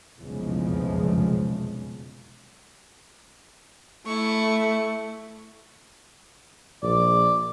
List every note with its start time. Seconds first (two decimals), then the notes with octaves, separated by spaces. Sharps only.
0.17 F1 B1 E2 C#3 F3 G#3
4.06 A3 E4 C#6
6.83 A#1 D5